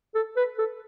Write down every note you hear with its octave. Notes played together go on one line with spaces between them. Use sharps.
A4
B4
A4